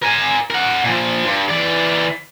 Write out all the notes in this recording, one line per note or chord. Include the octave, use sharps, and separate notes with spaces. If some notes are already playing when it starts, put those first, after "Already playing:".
A#4 G#5
A#4 F#5
A#2 F3
G2
E3 D5